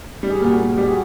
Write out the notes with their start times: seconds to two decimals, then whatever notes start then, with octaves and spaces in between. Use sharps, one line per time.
0.23 G3
0.30 G#4
0.38 G4
0.41 A#2 F#4 G#4
0.60 A#2
0.68 G#4
0.77 G3 G4
0.87 F#4 G#4